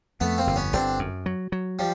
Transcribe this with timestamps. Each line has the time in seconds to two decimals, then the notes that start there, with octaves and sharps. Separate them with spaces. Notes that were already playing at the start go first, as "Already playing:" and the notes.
0.20 F2 A3 B3
0.38 A#3 C4
0.47 G1
0.56 B3 C#4
0.73 G1 C4 D4
0.99 F#2
1.26 F#3
1.52 F#3
1.79 F3 G3